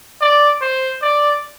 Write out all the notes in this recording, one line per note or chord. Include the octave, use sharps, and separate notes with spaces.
D5
C5
D5